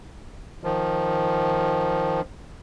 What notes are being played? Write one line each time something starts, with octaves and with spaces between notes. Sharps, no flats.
D#3 F3